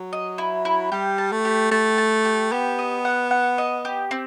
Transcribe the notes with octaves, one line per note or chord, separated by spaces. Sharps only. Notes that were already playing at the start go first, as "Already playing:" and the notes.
Already playing: F#3
D#5
E4
E4
G3 G4
A5
A3
G4
A3 A5
A5
G4
B3 G4
D#5
F#5
F#5
D#5
G4
C4